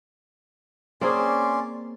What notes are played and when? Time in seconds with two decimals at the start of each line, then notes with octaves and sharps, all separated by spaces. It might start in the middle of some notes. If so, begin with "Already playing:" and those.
1.01 A#3 C4 C#4 G#4 D5 C6